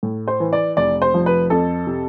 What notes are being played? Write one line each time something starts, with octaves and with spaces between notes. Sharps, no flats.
A2
C5
E3
D5
F1 D5
C5
F3
B4
F2 A4
C3